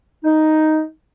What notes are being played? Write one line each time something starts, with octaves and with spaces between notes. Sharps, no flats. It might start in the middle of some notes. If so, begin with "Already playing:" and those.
D#4